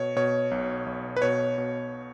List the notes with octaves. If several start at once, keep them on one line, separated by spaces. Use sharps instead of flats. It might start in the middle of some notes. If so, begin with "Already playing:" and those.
Already playing: B2 C#5
B2 C#5
B1
B1
B4
B2 C#5
B2